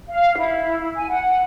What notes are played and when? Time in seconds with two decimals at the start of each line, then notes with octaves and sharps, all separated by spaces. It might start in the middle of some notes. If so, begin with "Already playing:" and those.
0.10 F5
0.38 E4
0.97 G#5
1.09 F#5